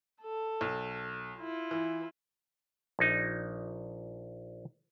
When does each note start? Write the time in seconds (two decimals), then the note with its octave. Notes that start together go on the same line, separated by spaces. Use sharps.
0.22 A4
0.61 B1
1.38 E4 F4
1.71 E3
2.99 A#1 D#4